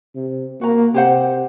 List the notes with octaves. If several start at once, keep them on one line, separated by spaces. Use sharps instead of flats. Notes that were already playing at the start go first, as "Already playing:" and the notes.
C3
A#3 F#4 A#5
C3 G4 C5 F#5